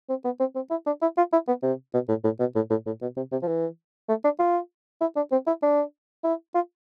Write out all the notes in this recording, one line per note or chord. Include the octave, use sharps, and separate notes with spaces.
C4
B3
C4
C4
E4
D4
E4
F4
E4
B3
C3
B2
A2
A2
B2
A2
A2
A2
B2
C3
C3
F3
E3
A3
D4
F4
E4
D4
C4
E4
D4
E4
F4